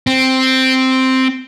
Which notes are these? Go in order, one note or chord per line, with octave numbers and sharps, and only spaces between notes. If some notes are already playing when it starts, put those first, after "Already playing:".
C4